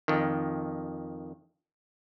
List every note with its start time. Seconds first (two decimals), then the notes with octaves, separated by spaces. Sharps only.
0.08 F2 D#3